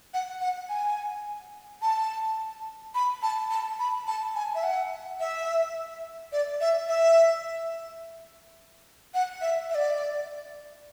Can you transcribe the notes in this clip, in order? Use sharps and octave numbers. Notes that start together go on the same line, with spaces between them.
F#5
F#5
G#5
A5
B5
A5
A5
B5
A5
G#5
E5
F#5
E5
D5
E5
E5
F#5
E5
E5
D5